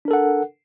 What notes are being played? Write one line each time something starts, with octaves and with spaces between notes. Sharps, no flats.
D4 A4 A#4 F#5